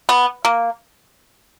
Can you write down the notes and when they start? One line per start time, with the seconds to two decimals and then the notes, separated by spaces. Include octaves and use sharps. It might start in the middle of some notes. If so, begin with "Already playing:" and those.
0.09 B3
0.45 A#3